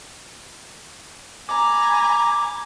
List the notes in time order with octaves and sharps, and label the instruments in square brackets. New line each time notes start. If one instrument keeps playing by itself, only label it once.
[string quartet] G#5 A#5 B5 [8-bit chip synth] D6